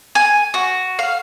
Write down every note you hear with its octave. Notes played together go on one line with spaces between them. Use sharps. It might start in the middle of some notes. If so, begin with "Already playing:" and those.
G#5
F#4
F5